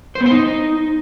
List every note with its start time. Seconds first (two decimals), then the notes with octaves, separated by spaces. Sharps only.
0.15 C5
0.21 B3
0.26 C5
0.31 D#4